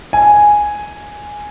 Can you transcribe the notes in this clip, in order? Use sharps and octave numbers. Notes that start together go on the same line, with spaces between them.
G#5